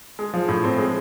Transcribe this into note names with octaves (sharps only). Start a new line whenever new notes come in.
G#3
F3
A2
C4
G#3